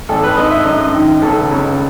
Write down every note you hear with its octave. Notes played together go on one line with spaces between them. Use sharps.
G#1 A4
B4
G#2 D#5
E5
F#2 D#5
D#3
C#2 A4
C#2